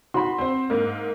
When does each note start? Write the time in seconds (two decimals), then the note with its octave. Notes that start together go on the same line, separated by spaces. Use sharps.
0.14 F#4 B5 C6
0.38 C4 C5
0.70 G#2 A#3